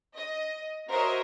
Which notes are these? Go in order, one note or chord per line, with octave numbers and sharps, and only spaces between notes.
D#5
F#4 A#4 C5 C#5 D#5 E5